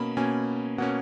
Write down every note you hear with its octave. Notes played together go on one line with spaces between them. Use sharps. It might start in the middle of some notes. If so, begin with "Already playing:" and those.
Already playing: B2 A#3 C#4 B5
B2 A#3 C#4 G#5
B2 A#3 C#4 F#5